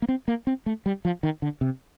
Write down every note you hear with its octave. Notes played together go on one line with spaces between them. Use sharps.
A#3
C4
A#3
C4
A3
G3
F3
D#3
D3
C3